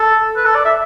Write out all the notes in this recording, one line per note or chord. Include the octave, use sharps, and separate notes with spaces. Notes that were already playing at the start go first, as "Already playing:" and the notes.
Already playing: A4
B4
A4
D5
E5